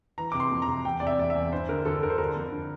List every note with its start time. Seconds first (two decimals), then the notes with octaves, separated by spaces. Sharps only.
0.18 E3 A#5
0.32 C3 D6
0.40 C6
0.51 F2
0.62 A#5
0.68 C3
0.85 E2 G5
1.00 C3 D5
1.07 E5
1.19 E2 D5
1.30 E2 E5
1.52 G2 C5
1.69 D3 A#4
1.85 D3 A4
2.02 G2 A#4
2.10 C5
2.18 D3 A#4
2.36 F2
2.52 D3